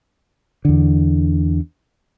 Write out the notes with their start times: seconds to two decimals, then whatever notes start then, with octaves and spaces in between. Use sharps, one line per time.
0.65 E2 D3